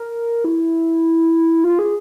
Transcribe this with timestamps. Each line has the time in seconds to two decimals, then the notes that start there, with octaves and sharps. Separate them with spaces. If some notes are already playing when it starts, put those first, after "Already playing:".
Already playing: A#4
0.44 E4
1.64 F4
1.79 G#4